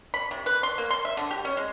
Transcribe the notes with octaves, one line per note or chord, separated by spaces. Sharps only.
B5
C3
B4
C6
A#3
C6
E5
D3
G4
C#4
G#3